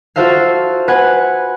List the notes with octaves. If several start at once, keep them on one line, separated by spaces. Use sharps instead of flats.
F4 F#4 A4 C5 E5 F5
B4 F#5 G#5